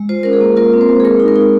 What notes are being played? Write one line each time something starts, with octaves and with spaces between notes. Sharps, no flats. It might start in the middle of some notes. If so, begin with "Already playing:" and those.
Already playing: G#3
F4 C5
C#4 A#4
G#4
A#3
F4 A#4
C4
C5
G#3
G#4
G#3 A#4
D#4
A#4
D#4